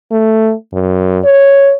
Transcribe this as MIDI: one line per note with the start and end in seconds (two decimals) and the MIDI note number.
0.11 0.53 57
0.73 1.19 42
1.25 1.74 73